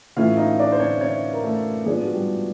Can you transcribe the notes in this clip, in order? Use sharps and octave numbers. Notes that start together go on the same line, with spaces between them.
A2 E3 A3 C#4 F4 F5
D#4 D#5
D4 D5
C5
C#4 C#5
C#4 C#5
A#4
A3 A4
G#2 F3 G#3 B3 D4 G#4
F#4
G3 G4